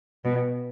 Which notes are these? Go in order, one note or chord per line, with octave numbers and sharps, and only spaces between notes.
B2